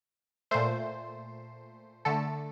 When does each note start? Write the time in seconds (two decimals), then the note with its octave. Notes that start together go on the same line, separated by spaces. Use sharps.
0.51 A#2 A3 C5
2.05 D3 A3 A4